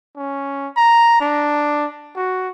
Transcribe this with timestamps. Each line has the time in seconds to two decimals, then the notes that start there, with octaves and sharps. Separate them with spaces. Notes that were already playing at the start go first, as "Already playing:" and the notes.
0.17 C#4
0.77 A#5
1.21 D4
2.16 F#4